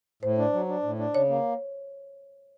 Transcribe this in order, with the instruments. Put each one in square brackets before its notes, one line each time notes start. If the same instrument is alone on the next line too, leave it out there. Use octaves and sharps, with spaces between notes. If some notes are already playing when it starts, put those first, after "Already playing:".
[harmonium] A2 [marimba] C5
[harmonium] D4
F#3
D4
A2
D4
[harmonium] C#3 [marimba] C#5
[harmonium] A#3